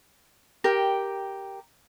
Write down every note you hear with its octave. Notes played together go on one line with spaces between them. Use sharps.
G4 A#4 G5